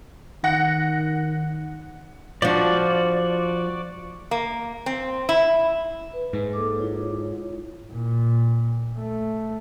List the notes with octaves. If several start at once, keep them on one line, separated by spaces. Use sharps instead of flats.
D#3 F#5 A#6
F3 D4 F#4 D5
A#3
C4
E4
B4
G#2
A#3 A4 D6
E4 F4 C#5
A#2
A3